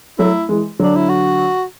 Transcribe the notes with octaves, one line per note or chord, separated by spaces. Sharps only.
F#3 A3 E4
E3 G#3
D3 F#3 D4
E4
F#4